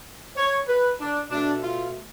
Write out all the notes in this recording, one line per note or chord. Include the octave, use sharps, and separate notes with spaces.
C#5
B4
D4
B2 A3 D4
F4